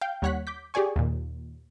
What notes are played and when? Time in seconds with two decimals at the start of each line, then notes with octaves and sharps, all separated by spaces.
0.01 F5 G5 G6
0.22 D#2 G3 C#5 F#5 F#6 B6
0.47 D6 G6 B6
0.74 G4 G#4 D5 G#5 C#6
0.96 D#2 A#2